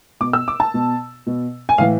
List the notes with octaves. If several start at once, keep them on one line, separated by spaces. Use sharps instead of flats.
B2 D6
E6
D6
A5
B2
B2
G#5
A2 E3 F5